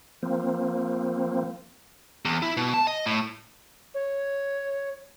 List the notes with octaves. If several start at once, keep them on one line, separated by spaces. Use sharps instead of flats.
F3 A#3 C4
E2
E4
B2
A5
D#5
A2
C#5